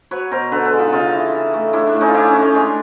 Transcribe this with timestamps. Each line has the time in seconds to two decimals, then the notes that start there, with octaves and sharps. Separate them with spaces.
0.11 F#3 B4 C#5
0.31 B2 A#4 C5
0.52 D3 A4 B4
0.65 A4 B4
0.72 G#3
0.79 D#4 F4
0.93 C#3 D#4 F4
1.13 E3
1.33 E3
1.54 A3
1.73 A2 D4 E4
1.87 D4
1.94 A2
2.01 C#4 D#4
2.08 F4
2.14 F3 D4 E4
2.28 C#4 D#4
2.34 A3
2.42 C#4
2.54 G#3 D4